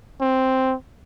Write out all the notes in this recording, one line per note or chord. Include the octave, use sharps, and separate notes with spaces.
C4